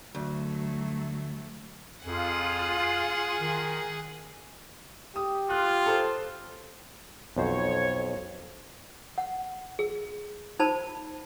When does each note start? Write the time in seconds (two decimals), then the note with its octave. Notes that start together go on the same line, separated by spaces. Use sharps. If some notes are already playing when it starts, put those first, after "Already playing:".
0.15 D2 F#3 A3
2.05 F2 F4 G#4 F#5
3.40 D#3
5.16 G4 D#6
5.50 F4 F#6
5.86 A4 C5
7.36 B1 F2 C5 C#5
9.18 F#5
9.79 G#4
10.59 D#4 C5 A5 B5